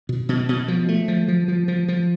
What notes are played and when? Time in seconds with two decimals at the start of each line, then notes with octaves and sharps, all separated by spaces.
0.09 B2
0.29 B2
0.49 B2
0.68 F3
0.88 A3
1.08 F3
1.28 F3
1.48 F3
1.68 F3
1.88 F3